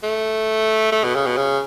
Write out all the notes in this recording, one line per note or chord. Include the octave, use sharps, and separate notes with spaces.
A3
A3
B2
C#3
B2
C#3